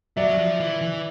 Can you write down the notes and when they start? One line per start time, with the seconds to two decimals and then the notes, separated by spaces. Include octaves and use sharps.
0.17 F#3 D5 E5
0.38 F3
0.60 E3
0.82 E3